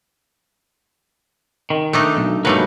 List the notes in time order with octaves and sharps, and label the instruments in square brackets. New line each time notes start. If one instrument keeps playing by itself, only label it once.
[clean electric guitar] D#3
[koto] A3 D4 D#4
[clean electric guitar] B1
[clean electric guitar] G#2 F#3 A#3 [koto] G3 A3 B4